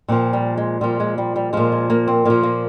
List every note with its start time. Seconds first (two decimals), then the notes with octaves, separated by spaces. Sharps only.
0.08 A#2 F3 C4
0.33 G3
0.57 G#3
0.81 A#2 F3 G3
1.00 G#3
1.18 G3
1.36 G3
1.53 A#2 F3 G#3
1.72 G#3
1.90 A#3
2.08 C4
2.25 A#2 F3 A#3
2.43 A#3